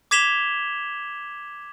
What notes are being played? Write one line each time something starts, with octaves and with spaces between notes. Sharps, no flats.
D6 G#6 B6 E7 F7 G7